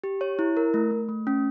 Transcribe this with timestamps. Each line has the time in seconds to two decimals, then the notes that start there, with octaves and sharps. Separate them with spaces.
0.04 G4
0.21 C#5
0.39 E4
0.57 A#4
0.74 A3
0.91 A3
1.09 A3
1.27 C#4